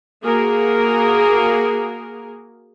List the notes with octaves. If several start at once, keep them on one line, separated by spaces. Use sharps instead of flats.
A#3 F#4 G#4 A#4